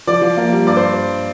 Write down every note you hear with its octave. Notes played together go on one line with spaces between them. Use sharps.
F3 D5
F3
A#3
G3
G2 D5
C5